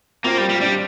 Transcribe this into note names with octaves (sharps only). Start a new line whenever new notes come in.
A#3 C4 F4
G3
G3
G3 D4